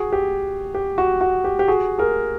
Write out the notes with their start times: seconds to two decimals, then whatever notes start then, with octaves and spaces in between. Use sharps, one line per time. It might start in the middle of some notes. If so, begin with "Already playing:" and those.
Already playing: F#4 G#4
0.12 G4
0.75 G4
0.98 F#4
1.21 F#4
1.44 G4
1.59 G4
1.68 F#4 G#4
1.98 G#4 A#4